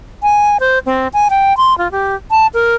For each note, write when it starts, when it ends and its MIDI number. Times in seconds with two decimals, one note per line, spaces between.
0.23 0.57 80
0.60 0.79 72
0.86 1.08 60
1.13 1.28 80
1.30 1.56 79
1.57 1.77 84
1.78 1.91 65
1.91 2.15 67
2.31 2.47 81
2.54 2.75 70